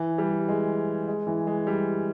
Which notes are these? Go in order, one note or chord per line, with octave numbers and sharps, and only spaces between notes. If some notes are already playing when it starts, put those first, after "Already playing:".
Already playing: E3
G3
G#3
G#3
E3
G#3
G3